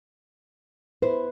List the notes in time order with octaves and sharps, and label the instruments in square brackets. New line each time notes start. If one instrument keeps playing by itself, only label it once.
[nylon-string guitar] E4 C5 [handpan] B4